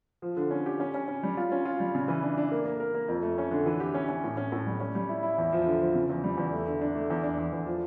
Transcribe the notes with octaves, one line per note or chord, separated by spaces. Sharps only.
F3
D3
C#4
G4
C#4
C#4
C#4
G3
F4
C#4
F4
G3
C#3
E3
D4
D4
A#3
A#3
A#4
A#3
F2
A3
C#4
D3
E3
G4
C#4
C#4
A2
C#4
A2
G3
C#4
G3
E4
E4
E2
F3
D3
F3
C#3
E2
G3
E2
A3
D3
D4
A3
E2
D4
E2
E2
F3